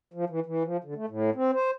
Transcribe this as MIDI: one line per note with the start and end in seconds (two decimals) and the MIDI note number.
0.14 0.25 53
0.30 0.40 52
0.46 0.63 52
0.65 0.77 53
0.84 0.94 50
0.95 1.06 57
1.09 1.30 45
1.35 1.51 60
1.54 1.71 72